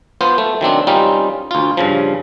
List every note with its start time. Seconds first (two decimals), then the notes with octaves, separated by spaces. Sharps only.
0.21 B3 F4 C5
0.38 A3
0.61 D#3 F#3 C4 D4
0.87 G3 C4 C#4 D#4 F4
1.51 D2 F4
1.77 G2 C#3 F3